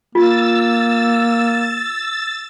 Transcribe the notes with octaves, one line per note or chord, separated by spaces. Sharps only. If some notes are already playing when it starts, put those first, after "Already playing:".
A#3 F4 E6 A6